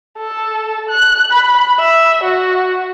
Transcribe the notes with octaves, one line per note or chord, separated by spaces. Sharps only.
A4
F#6
B5
E5
F#4